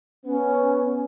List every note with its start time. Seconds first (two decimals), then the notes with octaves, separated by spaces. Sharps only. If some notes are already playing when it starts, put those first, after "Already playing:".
0.25 B3 C#4